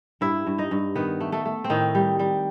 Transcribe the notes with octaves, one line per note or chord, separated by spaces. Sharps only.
G2 E4 E5
G2
D#4 D#5
G2
D#3 B3 B4
A3
A3 A4
A3
C4
A2 D#3 D#4
G3
G3